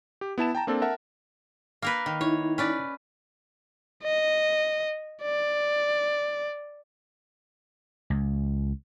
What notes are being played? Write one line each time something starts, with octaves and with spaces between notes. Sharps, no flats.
G4
B3 E4 A5 E7
G5 A5 A#5
A#3 C4 D4 A4
A#4 E5 F#5 A5
A#3 A#4 B4
D#3
D#4 E4 C#5
C#4 B4 D5
D#5
D5
C#2